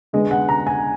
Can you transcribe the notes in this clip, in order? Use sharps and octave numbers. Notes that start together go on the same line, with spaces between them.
D3 G#3 B3 D#5
F#5
A#5
G#5